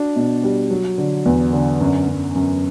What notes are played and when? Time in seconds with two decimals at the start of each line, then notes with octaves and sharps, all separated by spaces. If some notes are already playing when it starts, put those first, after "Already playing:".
Already playing: D4 F#4
0.16 B2
0.43 G3
0.71 F#3
0.98 D3
1.26 E2
1.53 D3
1.81 F#2
2.08 F#2
2.35 F#2